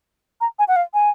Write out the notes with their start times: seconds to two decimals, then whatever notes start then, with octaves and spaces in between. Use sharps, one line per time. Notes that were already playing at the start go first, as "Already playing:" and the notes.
0.41 A#5
0.59 G#5
0.68 F#5
0.76 F5
0.94 G#5